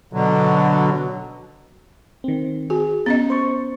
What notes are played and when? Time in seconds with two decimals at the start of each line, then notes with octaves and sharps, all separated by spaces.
0.13 B2 D3 F#3
2.24 D#3 C4
2.70 F#4 G#4
3.06 B3 C#4 D#5
3.30 C5 C#6